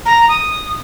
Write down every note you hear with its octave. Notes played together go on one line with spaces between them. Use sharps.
A#5
D#6